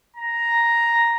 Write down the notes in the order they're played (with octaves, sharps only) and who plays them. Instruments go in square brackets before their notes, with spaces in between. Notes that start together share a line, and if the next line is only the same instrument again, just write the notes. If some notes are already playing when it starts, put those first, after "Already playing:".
[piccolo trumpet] A#5